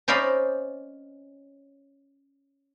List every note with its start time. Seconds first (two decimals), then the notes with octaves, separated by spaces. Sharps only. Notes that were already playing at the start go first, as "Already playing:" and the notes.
0.08 C#4 C5 D5 D#5 F5 B5